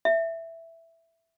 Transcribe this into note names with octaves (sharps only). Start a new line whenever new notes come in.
E5